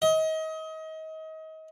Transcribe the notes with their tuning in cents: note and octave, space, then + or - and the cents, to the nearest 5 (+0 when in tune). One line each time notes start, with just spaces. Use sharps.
D#5 +30